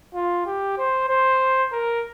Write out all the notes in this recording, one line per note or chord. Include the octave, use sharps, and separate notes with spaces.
F4
G4
C5
C5
A#4